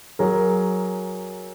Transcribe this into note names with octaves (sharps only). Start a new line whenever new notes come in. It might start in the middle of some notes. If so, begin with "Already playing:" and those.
F#3 G#4 A#4